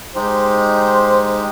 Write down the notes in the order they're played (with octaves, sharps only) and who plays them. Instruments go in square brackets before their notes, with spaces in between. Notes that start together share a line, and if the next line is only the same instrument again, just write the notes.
[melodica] G#3 D#4 G4 [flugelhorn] C5